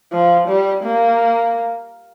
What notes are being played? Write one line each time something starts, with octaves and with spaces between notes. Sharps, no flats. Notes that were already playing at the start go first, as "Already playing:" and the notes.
F3
G3
A#3